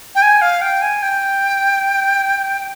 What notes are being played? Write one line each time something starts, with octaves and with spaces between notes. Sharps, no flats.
G5
G#5
F5
G5
G#5
G5